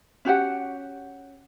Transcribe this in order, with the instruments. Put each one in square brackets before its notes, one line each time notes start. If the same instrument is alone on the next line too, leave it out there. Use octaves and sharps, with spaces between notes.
[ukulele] C#4 F#4 G4 F#5